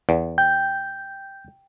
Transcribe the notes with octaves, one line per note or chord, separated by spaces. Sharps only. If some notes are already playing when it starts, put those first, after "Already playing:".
E2
G5 G6